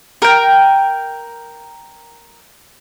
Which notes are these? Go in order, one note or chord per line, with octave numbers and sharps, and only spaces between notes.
A#4 G5